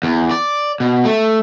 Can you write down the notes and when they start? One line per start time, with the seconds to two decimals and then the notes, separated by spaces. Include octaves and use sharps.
0.03 E2
0.31 D5
0.80 B2
1.05 A3